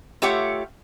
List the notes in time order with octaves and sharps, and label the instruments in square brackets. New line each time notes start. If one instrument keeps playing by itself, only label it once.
[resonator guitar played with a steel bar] A3 F4 G4 C#5 E5 F#5